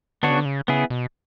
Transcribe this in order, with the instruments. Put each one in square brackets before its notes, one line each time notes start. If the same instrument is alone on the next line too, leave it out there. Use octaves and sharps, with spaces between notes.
[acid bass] D3 [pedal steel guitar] B3 D4 F#4 C#5
[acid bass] C#3
D3
C#3
[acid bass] C#3 [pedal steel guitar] B3 E4 G#4
[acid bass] B2